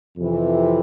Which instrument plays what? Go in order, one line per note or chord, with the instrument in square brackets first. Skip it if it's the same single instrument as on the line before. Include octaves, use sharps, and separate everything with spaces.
[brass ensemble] F2 C3 E3